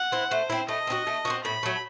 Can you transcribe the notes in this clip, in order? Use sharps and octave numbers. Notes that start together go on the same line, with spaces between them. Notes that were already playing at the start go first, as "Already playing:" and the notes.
Already playing: F#5
C4 E4
A3 C5
C4 E4
A3 D#5
C4 D#4 F#4
A3
D#4 F#4
C4
A2 B5
F#3 A3